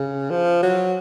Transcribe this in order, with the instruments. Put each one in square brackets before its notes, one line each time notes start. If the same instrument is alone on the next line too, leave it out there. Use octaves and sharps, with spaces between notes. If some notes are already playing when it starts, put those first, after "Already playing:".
Already playing: [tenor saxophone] C#3
F3
F#3